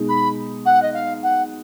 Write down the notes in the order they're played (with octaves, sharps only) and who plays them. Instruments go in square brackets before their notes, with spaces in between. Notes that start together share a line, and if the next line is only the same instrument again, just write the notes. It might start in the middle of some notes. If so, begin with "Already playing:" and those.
Already playing: [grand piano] B2 G#3 D#4
[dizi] B5
F#5
D#5
F5
F#5